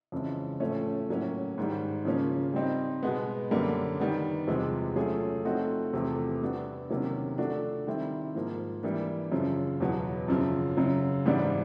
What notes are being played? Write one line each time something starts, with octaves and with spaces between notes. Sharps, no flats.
F2 C#3 E3 G#3
A2 F3 A3 C#4
A2 F#3 A#3 C#4
G#2 D#3 G3
C#3 F3 A#3 C#4
G3 C4 D#4
B2 G#3 B3
F#2 D3 G3 A#3
D#3 G3 B3
E2 C3 F3 G#3
F#3 A3 C#4 F4 G#4
F3 A3 C4 D#4 F#4
E2 C3 F3 A3 C4
G3 B3 D4 F#4
C3 D#3 F#3 A#3 C#4
F3 A3 D4 F#4 A4
D#3 G3 C4 E4
G#2 F3 A#3
E3 G3 A#3 D4
F#2 C#3 F3
E2 B2 F#3 B3
F#2 C#3 F3
F#2 C#3 F#3
G#2 E3 G3 B3 D4